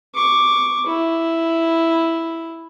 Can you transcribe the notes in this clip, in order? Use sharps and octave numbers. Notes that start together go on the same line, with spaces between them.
C#6 D6
E4